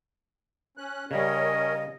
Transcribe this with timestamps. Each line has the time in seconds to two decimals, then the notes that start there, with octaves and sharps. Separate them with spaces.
0.77 C#4 F#6
1.11 C#3 G3 C#4 A#4 C#5 D#5